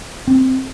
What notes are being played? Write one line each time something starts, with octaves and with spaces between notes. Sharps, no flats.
C4